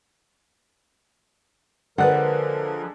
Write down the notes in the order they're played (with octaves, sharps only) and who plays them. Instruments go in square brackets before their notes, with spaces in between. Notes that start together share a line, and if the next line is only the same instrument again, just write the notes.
[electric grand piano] D3 G#3 F#6 [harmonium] F3 A#4 [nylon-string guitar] B4 D5 F#5